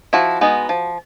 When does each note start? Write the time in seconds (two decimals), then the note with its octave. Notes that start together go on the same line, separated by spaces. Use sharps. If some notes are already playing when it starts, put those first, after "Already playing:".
0.13 F3 E4 F#4
0.41 G#3 B3 D#4
0.69 F3